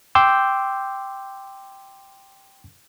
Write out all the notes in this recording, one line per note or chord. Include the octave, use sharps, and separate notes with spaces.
G5 C6 D6 E6 G6